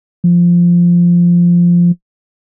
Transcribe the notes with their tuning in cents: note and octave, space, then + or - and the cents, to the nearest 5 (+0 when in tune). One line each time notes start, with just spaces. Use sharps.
F3 -5